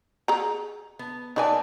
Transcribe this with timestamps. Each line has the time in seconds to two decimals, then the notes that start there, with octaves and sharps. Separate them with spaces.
0.28 G#4 A#5
0.99 B3
1.36 A3 A#3 D#4 B4 D5 G#5